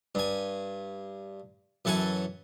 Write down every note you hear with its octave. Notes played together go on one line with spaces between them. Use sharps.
G2 G#5
F#2 E3 A4 F#5 G#5